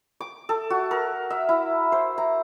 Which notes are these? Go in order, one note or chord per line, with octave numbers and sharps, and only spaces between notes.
D6
A4
F#4
A#4
E5
E4
C5
A#5